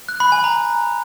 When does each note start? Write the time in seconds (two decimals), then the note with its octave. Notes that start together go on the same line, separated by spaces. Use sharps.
0.09 F#6
0.20 B5
0.32 G#5
0.44 A#5